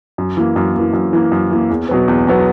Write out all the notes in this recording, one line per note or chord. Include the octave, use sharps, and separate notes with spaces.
F#2
E3 A#3
F#2
E3 A#3
F#2
E3 A#3
F#2
E3 A#3
E2
B2 F#3 B3
E2
B2 F#3 B3